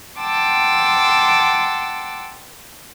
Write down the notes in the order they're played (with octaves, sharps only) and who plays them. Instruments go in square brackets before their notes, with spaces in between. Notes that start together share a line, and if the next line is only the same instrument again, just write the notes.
[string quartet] F#5 G5 A5 C6 D6 E6